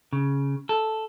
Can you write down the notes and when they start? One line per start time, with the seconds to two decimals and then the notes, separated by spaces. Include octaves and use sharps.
0.13 C#3
0.69 A4